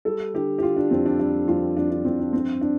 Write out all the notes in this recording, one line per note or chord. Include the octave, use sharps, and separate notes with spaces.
G3 A4
D3 G4
G4
D3 F4
D4
F2 C4
D4
G3 D4
F2 F4
F2 D4
D4
F2 C4
D4
G2 C4
D4